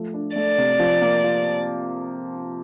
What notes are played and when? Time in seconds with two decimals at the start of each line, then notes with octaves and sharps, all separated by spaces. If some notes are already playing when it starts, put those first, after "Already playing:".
Already playing: F3 A3
0.14 D4
0.36 A3 D5
0.58 C3
0.79 F3
1.02 A#3
1.24 F4